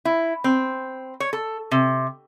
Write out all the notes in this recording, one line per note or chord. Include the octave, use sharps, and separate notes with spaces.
E4
C4
C#5
A4
C3